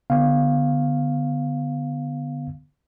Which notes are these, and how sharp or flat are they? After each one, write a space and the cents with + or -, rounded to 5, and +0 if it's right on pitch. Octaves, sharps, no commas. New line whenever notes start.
D3 +0 B3 +0 F5 +0